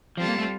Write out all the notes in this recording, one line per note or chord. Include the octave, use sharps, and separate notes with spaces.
F3 G3 C4 F4 A4
A#3
A3